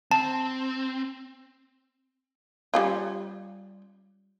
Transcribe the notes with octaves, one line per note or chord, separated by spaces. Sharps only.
C4 A5
G3 C#4 F4